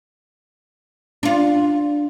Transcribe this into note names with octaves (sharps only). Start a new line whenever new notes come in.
D4 F4